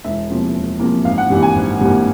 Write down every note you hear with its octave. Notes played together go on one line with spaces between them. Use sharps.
E1 E5
E2 C3 F3 A#3
E1
E2 C3 F3 A#3
G#1 F5
F#5
G2 E3 G3 A#3
G#5
G#1
G2 E3 G3 A#3